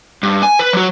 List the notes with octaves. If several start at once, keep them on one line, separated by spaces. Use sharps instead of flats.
G2
G#5
B4
F#3 F#4